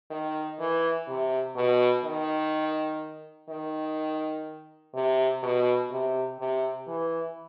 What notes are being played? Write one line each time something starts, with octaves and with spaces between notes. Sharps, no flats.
D#3
E3
C3
B2
D#3
D#3
C3
B2
C3
C3
E3